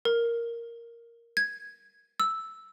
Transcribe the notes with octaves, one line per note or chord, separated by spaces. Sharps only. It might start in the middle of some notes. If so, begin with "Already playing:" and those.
A#4
G#6
E6